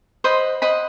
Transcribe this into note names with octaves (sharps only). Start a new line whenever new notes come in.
C5 D#5 F#5 B5
C5 D#5 F#5 B5